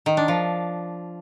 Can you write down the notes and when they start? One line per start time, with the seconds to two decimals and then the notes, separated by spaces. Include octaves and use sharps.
0.06 D#3
0.17 D4
0.28 F3